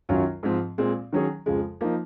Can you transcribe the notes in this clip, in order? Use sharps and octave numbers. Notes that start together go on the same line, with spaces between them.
F#2 D#3 F#3 C#4 F4
G#2 F3 C4
A#2 G#3 C4
D#3 F#3 C#4 G#4
F2 C#3 F3 G#3
F3 A#3 D#4